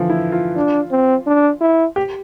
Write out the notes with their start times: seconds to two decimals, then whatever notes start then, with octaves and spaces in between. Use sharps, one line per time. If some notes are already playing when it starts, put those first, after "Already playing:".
Already playing: D3 E3 F3
0.10 E4
0.32 F4
0.56 D4
0.91 C4
1.27 D4
1.61 E4
1.96 G4